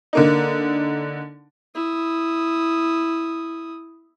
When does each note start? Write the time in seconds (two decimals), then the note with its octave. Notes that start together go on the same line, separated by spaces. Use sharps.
0.13 D3 A#3 D#4
1.75 E4 D#6